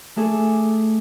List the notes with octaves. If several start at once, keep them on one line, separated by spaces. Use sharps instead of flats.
A3 D4 G#4 A4